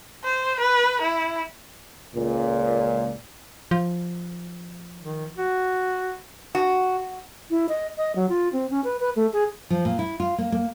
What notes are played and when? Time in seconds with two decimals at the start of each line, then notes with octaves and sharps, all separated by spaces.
0.24 C5
0.60 B4
1.02 E4
2.15 C#2 A#2
3.71 F3
5.01 D#3
5.38 F#4
6.55 F#4
7.51 E4
7.69 D#5
7.98 D#5
8.16 F#3
8.29 F4
8.53 C4
8.70 C#4
8.84 B4
9.00 B4
9.16 A3
9.33 G#4
9.70 F3
9.85 A#2
9.99 E4
10.20 F4
10.38 A#3
10.52 A#3